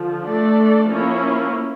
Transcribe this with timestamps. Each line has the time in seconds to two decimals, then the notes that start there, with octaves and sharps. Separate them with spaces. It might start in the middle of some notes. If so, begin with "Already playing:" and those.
Already playing: D3 F3
0.27 A3 D4 A4 D5
0.88 F3 A#3 C#4 E4